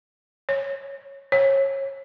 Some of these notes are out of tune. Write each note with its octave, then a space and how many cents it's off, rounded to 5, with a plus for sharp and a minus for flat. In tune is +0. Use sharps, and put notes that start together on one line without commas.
C#5 -10
C#5 -25